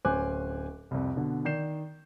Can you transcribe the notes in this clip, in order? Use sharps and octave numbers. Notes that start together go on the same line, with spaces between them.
D1 C#4 C5 G#5 D6 F#6
C2 F2
B2 D3
D#3 D5 G6 C7 E7